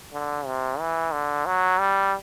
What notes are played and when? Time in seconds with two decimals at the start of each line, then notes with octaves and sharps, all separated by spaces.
0.13 D3
0.46 C3
0.79 E3
1.13 D3
1.46 F#3
1.79 G3